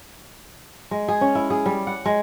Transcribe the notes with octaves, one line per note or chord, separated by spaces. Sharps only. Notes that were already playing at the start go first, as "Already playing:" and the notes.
G#3
G#4
C#4
E4
G#4
G3
F#5
G#3